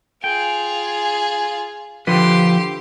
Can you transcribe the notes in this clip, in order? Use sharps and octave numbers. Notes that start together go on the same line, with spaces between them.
F4 G#4 G5
D3 F3 G4 B4 C6